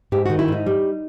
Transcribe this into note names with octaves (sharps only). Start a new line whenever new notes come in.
G#2 G4
D#3 F#4
E4
G#2 D#4
G3